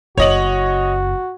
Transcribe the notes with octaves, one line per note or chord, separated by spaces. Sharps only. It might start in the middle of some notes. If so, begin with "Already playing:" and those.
F#1 F#4 C#5 D#5 F#7